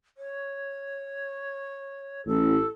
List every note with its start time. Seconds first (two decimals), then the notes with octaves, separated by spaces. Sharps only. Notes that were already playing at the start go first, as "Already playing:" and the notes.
0.17 C#5
2.26 A1 A4